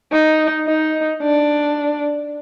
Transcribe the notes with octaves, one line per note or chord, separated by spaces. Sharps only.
D#4
D#4
D4